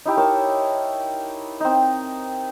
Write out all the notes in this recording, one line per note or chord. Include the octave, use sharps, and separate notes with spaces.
D#4 E4 G4
A#4 C#5 A5
C4 D#4